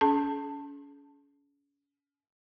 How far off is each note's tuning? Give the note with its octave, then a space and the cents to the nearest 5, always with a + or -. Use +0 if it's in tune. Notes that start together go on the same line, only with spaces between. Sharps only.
C#4 +35 G#4 +40 A5 +15